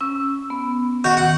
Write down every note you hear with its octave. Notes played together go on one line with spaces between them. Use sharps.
C#4 E6
B3
D#3 F#4
F#5